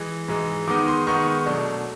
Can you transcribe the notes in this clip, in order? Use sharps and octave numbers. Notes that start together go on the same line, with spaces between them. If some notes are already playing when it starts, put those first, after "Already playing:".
Already playing: E3 G#3
G#2 E3 G#3
D#3 G#3 B3 D#4 D6
C6
D#3 G#3 B3 D#4 C#6
B2 F#3 A3 D4